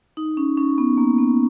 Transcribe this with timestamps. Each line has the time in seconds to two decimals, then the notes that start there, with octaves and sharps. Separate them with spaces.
0.17 D#4
0.37 C#4
0.58 C#4
0.78 B3
0.97 A#3
1.18 B3